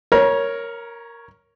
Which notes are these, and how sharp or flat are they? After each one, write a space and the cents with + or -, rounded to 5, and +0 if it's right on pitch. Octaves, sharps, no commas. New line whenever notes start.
A#4 +0 C#5 +0 A#5 +40